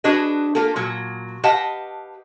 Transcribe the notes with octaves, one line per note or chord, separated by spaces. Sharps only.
D4 F#4 G#4 B4 D#5
A#3 F4 G4 A4
A#2 F#3
G4 B4 D#5 F5 F#5 A5